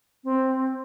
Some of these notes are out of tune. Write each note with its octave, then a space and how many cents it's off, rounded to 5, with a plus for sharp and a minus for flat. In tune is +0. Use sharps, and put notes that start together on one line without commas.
C4 +5